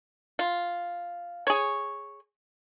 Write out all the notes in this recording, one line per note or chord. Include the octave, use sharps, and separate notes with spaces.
F4
G#4 C#5